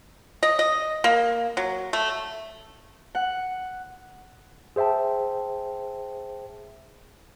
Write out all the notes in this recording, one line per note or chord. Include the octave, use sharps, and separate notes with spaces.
D#5
D#5
A#3
F#3
A3
F#5
G#4 C5 E5 G5 A5